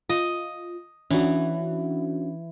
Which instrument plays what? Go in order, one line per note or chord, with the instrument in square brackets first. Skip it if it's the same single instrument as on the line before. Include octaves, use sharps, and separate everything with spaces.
[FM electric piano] F4 [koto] D#5
[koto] E3 [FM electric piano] C#4 D4 F#4